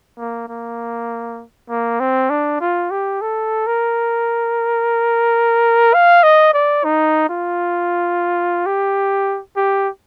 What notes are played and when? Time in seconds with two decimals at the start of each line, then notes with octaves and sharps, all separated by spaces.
0.18 A#3
0.49 A#3
1.70 A#3
2.00 C4
2.30 D4
2.61 F4
2.91 G4
3.21 A4
3.67 A#4
5.94 F5
6.23 D#5
6.54 D5
6.84 D#4
7.29 F4
8.66 G4
9.57 G4